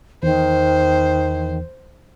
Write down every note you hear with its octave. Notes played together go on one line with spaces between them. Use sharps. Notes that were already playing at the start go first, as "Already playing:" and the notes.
E2 D#3 C5